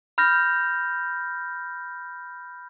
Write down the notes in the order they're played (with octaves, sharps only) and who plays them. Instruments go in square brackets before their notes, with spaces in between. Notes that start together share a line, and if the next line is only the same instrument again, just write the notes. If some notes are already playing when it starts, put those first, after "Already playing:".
[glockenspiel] B5 F6 G6 A#6